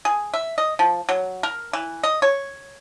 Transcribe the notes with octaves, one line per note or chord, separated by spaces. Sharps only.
G#4
E5
D#5
F3
F#3
A#4
E3
D#5
C#5